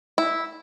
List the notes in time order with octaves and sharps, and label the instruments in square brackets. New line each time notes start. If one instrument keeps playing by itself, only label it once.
[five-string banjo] E4